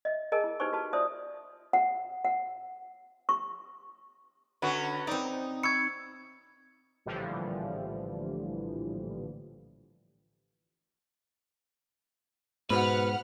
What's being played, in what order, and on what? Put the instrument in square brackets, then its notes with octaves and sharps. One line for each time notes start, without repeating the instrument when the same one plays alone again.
[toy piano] D#5 E5
G#4 A#4 D#5 G#5 A5
E4
D#4 G4 B4 C5 G#5 C#6
F#4 B4 A5
F4 C5 D5 E5 A5 D#6
F#5
F#5
C#6
[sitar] D3 C#4 F#4 [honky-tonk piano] B4 B5 [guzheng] G#5
[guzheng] C4 D5 [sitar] D#4
[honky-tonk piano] B5 C#6 E6 [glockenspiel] G#6 C#7
[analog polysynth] A#1 A2 D3 E3 F3 G3
[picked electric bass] G#2 [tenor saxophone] B2 [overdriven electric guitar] B4 [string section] F#5 F6